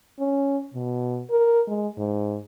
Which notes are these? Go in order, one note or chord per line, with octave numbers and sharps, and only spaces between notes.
C#4
B2
A#4
G#3
G#2